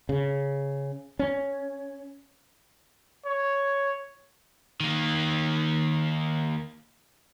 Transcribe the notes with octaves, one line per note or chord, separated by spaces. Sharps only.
C#3
C#4
C#5
D#3 A#3